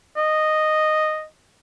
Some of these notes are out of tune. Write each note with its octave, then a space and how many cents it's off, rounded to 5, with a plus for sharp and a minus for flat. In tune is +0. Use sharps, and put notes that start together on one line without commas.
D#5 -5